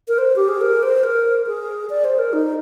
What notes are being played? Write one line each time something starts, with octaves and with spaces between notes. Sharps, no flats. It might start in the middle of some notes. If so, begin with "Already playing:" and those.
A#4
C5
G4
G#4
A#4
C5
A#4
G#4
D5
C5
A#4
D#4